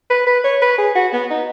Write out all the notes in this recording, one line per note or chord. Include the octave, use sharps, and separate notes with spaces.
B4
B4
C#5
B4
G#4
F#4
B3
D#4